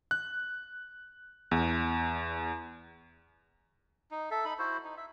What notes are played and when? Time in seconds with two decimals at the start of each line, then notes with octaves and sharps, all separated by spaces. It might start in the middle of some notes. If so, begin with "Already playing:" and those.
0.11 F#6
1.51 E2
4.11 D#4
4.31 A4 E5
4.45 D#4 B5
4.59 E4 F#4 C5
4.84 D#4
4.97 E5